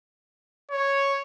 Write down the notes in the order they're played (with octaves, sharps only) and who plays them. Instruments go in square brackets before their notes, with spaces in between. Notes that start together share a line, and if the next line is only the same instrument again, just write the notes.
[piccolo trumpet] C#5